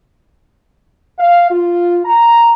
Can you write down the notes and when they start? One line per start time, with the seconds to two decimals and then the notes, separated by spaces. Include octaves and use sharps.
1.18 F5
1.50 F4
2.04 A#5